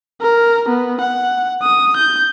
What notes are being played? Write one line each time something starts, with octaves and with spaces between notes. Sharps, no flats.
A#4
B3
F#5
D#6
G6